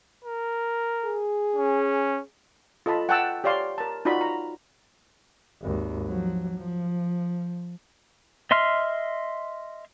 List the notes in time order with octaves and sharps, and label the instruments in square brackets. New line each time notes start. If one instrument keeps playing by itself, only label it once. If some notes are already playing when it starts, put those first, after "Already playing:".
[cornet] A#4
[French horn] G#4
[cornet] C#4
[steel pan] F4 A4 D#5 A5 B5
F#5 G5 A5 E6
G4 C#5 D5 F5 C6
A#4 A5
D#4 F4 F#4 D5 B5
A#5
[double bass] G#1 D#2
F3 F#3
F3
[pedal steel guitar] D#5 E5 C6 F6